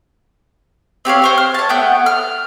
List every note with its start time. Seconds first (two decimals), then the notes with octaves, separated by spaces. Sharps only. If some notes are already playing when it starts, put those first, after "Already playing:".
1.05 C4 G4 C#5 F5
1.22 C5 C#6 F6
1.38 F6
1.54 C#5 A5
1.69 A3 B3 F#5 G5
2.06 F6